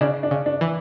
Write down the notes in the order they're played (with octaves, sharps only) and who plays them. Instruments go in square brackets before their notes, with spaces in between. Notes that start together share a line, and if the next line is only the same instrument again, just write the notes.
[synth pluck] C#3 [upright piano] D4
[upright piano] D4
[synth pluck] C#3
[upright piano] D4
[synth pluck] E3